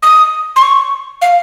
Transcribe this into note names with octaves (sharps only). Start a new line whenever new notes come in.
D#6
C6
C#6
F5